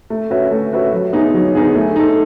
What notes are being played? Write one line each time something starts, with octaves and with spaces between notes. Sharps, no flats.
A3
C#4 F#4 B4 E5
A3
C#4 F#4 B4 E5
F#3
B3 D#4 G#4
F#3
B3 D#4 G#4
A3
D#4 A4